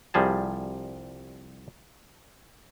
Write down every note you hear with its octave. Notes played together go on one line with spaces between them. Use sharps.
C2 F3 G3 G#4 A5